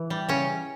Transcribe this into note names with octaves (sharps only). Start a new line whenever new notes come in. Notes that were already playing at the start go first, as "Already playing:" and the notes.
Already playing: E3
G3
C#3 C#4